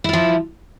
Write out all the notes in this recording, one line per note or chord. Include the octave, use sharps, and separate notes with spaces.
F3 E4 F4